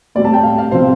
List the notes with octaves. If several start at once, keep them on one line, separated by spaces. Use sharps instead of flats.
A2 G3 C4 D5
A5
G5
F5
F5
C3 F3 C4 C5